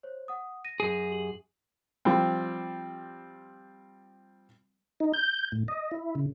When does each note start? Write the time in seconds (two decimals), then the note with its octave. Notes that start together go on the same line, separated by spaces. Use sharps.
0.03 C5 C#5
0.28 F#5 D#6
0.65 A#6 D#7
0.80 F#2 G#4
1.11 G4 F#7
2.05 F3 G3 C4
5.00 D#4
5.13 G6
5.52 A2
5.68 D#5
5.91 E4
6.15 C#3